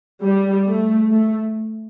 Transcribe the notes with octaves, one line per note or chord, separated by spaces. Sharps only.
G3
A3
A3